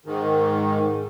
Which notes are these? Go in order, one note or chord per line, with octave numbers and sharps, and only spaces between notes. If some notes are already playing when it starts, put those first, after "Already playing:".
G#2 D#3